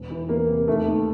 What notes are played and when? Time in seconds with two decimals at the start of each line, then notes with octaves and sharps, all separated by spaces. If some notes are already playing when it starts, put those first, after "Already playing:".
Already playing: E1
0.10 E3
0.29 E2 A#3
0.48 C3
0.67 D#2 A3
0.87 D#2